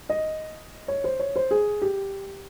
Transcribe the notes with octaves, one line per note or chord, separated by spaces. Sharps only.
D#5
C#5
C5
C#5
C5
G#4
G4